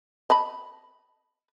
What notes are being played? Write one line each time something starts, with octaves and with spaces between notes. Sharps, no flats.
D#5 A5 B5